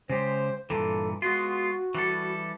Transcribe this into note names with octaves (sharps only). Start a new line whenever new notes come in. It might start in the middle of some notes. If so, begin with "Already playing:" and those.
C#3 G#3 G4 C5
G2 A#2 E3 A4
G#3 B3 F4 F#4
E3 G3 A4